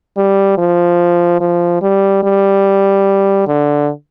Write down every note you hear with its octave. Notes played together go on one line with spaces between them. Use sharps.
G3
F3
F3
G3
G3
D3